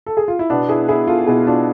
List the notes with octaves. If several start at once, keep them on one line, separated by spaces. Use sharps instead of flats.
A4
G#4
F4
E4
B2 B3 D4
E4 G#4
E4 G#4
F4 A4
B2 E4 G#4
D4 F4